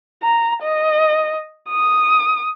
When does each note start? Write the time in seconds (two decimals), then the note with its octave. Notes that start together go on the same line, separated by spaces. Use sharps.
0.23 A#5
0.63 D#5
1.69 D#6